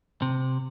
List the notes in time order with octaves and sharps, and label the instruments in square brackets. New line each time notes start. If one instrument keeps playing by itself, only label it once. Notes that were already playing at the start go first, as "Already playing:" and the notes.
[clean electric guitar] C3